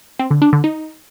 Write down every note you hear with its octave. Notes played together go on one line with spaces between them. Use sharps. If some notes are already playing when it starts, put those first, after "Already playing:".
C4
D3
D4
D3
D#4